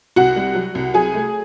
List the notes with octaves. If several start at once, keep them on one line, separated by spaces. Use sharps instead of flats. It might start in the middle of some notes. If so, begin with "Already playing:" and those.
C2 F#4 F#5
G3
F#3
C2
F#3 G#4 G#5
A3